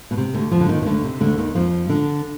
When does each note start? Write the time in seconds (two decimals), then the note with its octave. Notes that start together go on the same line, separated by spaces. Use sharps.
0.11 B2
0.17 C3
0.34 D2 D3
0.51 F2 F3
0.60 D3
0.69 D#2 D#3
0.82 D#3
0.86 D2 D3
1.04 C3
1.20 D2 D3
1.38 D#2 D#3
1.55 F2 F3
1.89 D3 D4